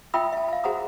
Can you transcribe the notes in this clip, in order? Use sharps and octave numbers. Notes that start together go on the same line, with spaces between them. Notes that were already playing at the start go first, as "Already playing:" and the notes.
F4 E5 G5 B5 D#6 E6
E5 A5
F5 A5
F#4 G#4 C5 F#5 A#5 D#6